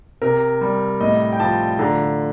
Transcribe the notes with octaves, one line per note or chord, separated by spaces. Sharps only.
C3 A#4
G3
A2 D#5
G5
F3 A5
D3 A#5